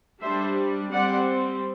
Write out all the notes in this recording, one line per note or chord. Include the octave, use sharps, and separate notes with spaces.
G3 D4 C5 E5
G3 C4 D5 F#5